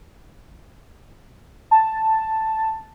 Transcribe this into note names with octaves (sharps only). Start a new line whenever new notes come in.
A5